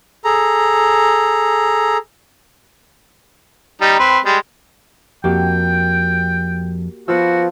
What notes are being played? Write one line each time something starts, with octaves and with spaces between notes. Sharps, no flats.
G#4 A4 A#5
G3 D#4
C4 B4
G3 G#3
F2 A#3 F#4 G4 G5
F3 B3 F#4 F5 E6